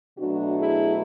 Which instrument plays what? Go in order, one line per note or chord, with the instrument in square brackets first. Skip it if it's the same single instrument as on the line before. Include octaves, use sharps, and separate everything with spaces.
[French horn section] B2 F#3 A3 D4 F#4
E4 G#4